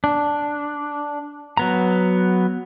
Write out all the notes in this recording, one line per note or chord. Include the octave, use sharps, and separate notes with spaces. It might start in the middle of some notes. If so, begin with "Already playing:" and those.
D4
F#3 B3 A#5